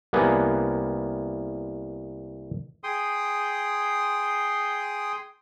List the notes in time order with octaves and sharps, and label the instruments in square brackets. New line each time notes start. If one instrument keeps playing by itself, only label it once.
[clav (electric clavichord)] C2 A#3 B3 F#5 G#5
[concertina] G#4 G5 C6 D#6